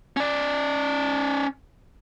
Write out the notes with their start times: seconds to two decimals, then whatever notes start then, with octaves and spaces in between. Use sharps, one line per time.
0.17 C#4 D5